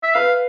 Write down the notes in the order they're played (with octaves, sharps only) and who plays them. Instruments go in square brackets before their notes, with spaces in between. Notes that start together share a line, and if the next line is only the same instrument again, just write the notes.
[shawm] E5
[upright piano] B4 [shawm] F5